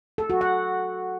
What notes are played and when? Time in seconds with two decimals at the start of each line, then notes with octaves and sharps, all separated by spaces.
0.18 A4
0.30 F#4
0.41 F#5